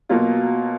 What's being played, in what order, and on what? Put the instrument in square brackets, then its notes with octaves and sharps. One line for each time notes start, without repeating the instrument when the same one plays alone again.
[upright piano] B2 F#3 A#3 F4